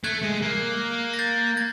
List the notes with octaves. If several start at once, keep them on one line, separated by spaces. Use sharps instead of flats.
A3 F#6 G#6
G#3
A#3
A#6
G6 A6
G#6 A#6